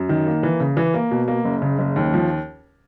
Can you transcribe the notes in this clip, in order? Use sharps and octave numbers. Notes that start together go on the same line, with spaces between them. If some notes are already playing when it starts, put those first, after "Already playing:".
Already playing: F#2
D#3
A#3
E3
C#3
E3
A#3
B2
A#3
F#1
C#3
F#1
D#2
F3